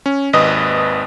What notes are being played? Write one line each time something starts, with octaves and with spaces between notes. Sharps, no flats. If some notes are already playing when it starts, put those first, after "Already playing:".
C#4
G#1 D#2 B4 D#5 D#6